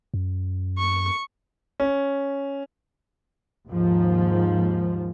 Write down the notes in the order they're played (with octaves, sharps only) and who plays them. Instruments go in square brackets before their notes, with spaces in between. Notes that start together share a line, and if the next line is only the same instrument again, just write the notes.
[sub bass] F#2
[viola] C#6
[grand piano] C#4
[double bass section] D#2 G#2 F3